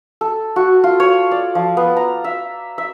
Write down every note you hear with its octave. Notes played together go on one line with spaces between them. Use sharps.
A4
F#4
F4
C#5
D5
F3
B3
A#5
E5
E5